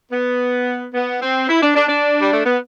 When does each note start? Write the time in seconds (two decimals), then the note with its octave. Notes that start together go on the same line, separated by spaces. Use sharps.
0.12 B3
0.94 B3
1.22 C4
1.49 E4
1.62 D4
1.76 D4
1.89 D4
2.21 G3
2.33 A3
2.45 B3